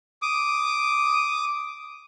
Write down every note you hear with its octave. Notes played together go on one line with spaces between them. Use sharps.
D6 D#6